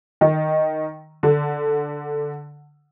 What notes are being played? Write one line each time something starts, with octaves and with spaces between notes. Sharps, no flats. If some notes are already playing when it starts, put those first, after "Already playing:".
D#3
D3